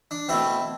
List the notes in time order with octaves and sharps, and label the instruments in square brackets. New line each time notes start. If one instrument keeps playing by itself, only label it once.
[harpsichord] D4
B2 A3 C4 E4